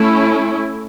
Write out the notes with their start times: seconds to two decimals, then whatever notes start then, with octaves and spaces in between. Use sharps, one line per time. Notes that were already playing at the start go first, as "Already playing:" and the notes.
Already playing: A3 C#4 E4